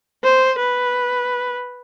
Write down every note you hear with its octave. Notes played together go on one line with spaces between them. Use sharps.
C5
B4